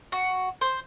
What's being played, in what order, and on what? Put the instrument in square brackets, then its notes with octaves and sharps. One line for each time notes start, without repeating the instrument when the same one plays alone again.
[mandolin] F#4
C5